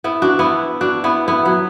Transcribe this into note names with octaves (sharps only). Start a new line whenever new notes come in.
B3 E4
D4 F#4
B3 E4
D4 F#4
B3 E4
B3 E4
F#3 B3